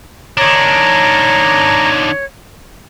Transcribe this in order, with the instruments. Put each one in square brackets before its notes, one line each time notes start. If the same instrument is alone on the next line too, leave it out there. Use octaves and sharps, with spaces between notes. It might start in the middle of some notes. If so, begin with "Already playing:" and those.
[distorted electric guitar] D#3 D4 [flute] C#5 [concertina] A#5